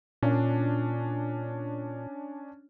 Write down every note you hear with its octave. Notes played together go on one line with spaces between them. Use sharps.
A#2 C#4 D4